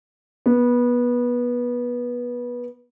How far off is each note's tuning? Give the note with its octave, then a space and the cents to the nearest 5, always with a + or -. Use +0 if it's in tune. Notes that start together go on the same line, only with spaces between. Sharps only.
B3 -20